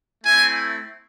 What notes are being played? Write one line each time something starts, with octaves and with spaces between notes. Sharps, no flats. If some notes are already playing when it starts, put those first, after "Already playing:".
A3 C4 E4 G#5